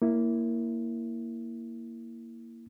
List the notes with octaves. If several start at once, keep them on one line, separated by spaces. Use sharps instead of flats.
A#3 E4